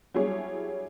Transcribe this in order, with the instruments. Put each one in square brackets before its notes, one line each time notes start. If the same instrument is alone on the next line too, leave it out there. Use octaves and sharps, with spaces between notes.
[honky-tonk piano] F#3 G3 D4 E4 G#4 C#5